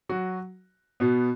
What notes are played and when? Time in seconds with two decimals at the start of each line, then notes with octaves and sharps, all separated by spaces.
0.09 F#3 F#4
1.00 B2 B3